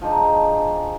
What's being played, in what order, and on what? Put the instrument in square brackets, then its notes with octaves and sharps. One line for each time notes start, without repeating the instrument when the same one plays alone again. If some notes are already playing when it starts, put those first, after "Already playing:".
[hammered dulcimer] F3 G#3 D4 D#4